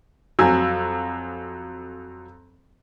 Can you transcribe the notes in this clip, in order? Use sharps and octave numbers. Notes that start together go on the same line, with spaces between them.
F2 F#3 G#5 E6